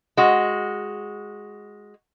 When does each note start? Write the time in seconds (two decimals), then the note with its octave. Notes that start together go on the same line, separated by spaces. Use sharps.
0.17 G#3 F#4